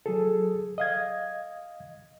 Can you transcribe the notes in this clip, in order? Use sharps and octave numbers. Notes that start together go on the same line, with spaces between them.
F#3 G#4 A4
D#5 F5 G#6